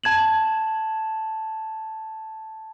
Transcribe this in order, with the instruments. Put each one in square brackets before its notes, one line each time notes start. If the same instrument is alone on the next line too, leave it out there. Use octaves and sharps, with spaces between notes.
[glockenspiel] A5 G#6 E7 F#7